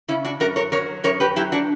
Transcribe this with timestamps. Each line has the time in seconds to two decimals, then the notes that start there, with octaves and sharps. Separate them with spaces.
0.08 C#3 C#4 E4
0.25 D4 F#4
0.40 F#2 F#4 A#4
0.56 A#4 C#5
0.72 F#3 A#4 C#5
1.04 F#2 A#4 C#5
1.20 G4 B4
1.36 F#3 E4 G4
1.52 D4 F#4